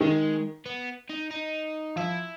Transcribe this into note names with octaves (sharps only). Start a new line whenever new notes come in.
D#3 G#3
B3
D#4
D#4
F3 E4